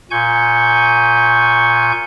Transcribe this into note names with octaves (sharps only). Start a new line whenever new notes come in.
A#2 G#5 C#6 G6